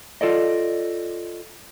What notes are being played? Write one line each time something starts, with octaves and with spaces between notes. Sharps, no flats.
F4 A4 D5 D#5